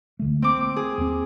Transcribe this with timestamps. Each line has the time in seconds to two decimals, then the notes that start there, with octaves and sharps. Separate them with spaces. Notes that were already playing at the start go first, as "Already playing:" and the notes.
0.19 C#2 D3 A3
0.42 A#3 C4 D6
0.76 G#4
0.98 D#2 C4